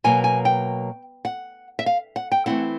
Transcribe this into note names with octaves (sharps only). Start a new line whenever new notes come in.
B2 F#3 A#3 G#5
G#5
G5
F#5
E5
F5
F#5
G5
E3 A3 C4 E4 F#5